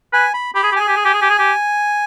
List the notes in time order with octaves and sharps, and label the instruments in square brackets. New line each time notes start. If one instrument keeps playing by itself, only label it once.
[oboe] B4 [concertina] G#5
[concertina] B5
[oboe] G4 [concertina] B5
[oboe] G#4
G4
[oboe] G#4 [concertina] G#5
[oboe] G4
G#4
G4
G#4
G4
G#4
G4